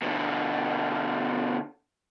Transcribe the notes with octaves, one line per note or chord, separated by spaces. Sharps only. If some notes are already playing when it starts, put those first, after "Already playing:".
B2 D3